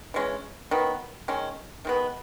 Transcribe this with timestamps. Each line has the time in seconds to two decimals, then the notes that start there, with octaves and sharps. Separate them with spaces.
0.14 E3 G#3 C#4
0.71 D#3 F#3 B3
1.28 D#3 G#3 C#4
1.85 D#3 G#3 B3